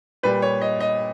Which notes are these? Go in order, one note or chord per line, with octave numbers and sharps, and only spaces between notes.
A#2 G3 B4
C#5
D#5
D#5